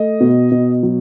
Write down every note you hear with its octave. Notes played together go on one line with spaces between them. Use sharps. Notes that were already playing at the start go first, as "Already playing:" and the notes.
Already playing: A3 D#5
B2
B2
F#3